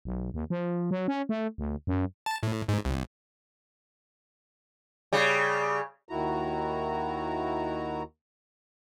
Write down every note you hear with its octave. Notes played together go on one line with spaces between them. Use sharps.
B1
D#2
F3
F#3
C#4
A3
D2
F#2
A5
A2
G#2
C2
C#3 G3
D#2 D#3 E4 F#4 A#5